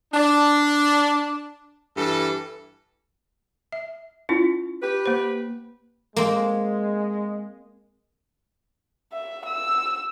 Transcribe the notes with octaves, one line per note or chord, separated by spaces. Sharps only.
D4
G2 E3 A4
E5
C#4 E4 F4
G4 B4
A#3 C5
G#3 A#3 C4
E5
E6